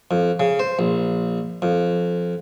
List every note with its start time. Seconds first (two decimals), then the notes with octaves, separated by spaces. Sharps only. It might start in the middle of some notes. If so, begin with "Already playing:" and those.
0.11 F2
0.40 C#3
0.59 C5
0.79 A#1
1.62 F2